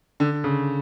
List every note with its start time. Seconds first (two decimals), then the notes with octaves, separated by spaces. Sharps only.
0.20 D3
0.44 C#3